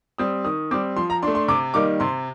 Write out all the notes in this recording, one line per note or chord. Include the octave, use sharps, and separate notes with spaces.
G3 C4 D#6
D#3 D#6
G3 C4 D6
F3 C6
A#5
A3 D4 C6
C6
C3 D6
D#3 G3 A#3 D#4 D6
C3 C6